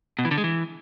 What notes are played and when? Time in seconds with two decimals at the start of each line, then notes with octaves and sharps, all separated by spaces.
0.19 B2
0.25 E3
0.31 D3
0.38 G#3
0.44 E3